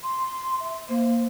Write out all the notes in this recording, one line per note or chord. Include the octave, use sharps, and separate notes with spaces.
C6
E5
A#3 C5